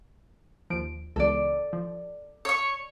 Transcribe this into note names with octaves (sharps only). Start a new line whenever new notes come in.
D#2 F3 D7
C#2 E3 B3 A4 D5
F3
C#5 C#6